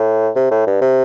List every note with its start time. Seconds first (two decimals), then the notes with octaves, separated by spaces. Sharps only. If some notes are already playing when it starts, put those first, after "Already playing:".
Already playing: A2
0.35 C3
0.51 A2
0.67 G2
0.81 C3